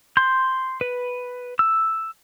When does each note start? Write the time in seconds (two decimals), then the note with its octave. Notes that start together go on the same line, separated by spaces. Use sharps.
0.17 C6 G6
0.81 B4
1.59 E6